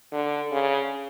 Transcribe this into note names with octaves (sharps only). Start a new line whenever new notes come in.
D3
C#3